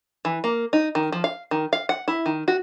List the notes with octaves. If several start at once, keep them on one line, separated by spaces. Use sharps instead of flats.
E3
A#3
D#4
D#3
F3
F5
D#3
F5
F#5
E4
D#3
F#4